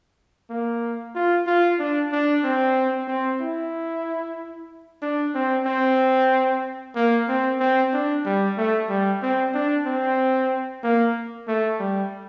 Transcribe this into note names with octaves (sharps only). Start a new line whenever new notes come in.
A#3
F4
F4
D4
D4
C4
C4
E4
D4
C4
C4
A#3
C4
C4
D4
G3
A3
G3
C4
D4
C4
A#3
A3
G3